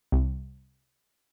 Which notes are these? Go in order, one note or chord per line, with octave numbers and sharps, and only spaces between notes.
C2